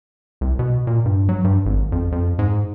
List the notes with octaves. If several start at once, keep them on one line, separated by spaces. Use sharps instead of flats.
C2
B2
A#2
G2
F#3
G2
G#1
F2
F2
G#2